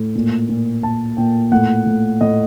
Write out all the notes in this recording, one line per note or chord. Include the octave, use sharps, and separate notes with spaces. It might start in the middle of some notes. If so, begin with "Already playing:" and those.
Already playing: A2
A#2
A#2
A#2 A5
A#2 G5
A2 F#5
A2
A2 D#5